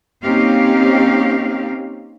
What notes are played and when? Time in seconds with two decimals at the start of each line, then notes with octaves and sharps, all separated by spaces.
0.22 A#3 C4 C#4 D#4 G4 F5